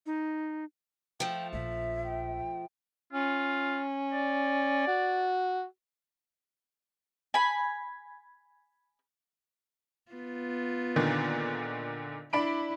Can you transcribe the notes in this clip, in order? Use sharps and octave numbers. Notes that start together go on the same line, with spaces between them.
D#4
F3 A3 G5
A#1 E5
G5
C#4 F4
D5
F#4
G#5 B5
B3 F4
A#2 D3 D#3
D4 E4 B5 D7